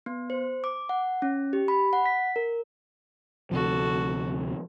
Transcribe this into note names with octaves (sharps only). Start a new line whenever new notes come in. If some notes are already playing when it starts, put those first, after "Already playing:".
B3
C5
D6
F#5
C#4
G4
B5
F#5
B6
A#4
D2 C3 F3 F#4 A4